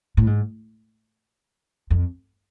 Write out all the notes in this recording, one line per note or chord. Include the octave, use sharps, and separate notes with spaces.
A2
G#2
F2